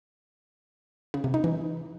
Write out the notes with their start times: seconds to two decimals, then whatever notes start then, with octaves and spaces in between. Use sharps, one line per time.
1.14 C#3
1.24 C3
1.34 D#4
1.44 E3